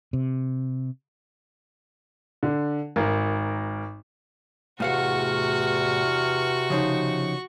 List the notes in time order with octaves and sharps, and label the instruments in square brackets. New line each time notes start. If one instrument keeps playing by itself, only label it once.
[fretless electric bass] C3
[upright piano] D3
G#1 A#4
[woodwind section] E2 F6 [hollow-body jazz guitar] A2 F5 F#5 [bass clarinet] C3 [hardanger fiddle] F#4 C#6
[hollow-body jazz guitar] C#3 F3 D#4